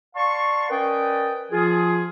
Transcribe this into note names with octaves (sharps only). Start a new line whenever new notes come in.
D5 F5 A5 C6 C#6
C#4 A#4 B4 D5 D#5 G5
F3 F4 G#4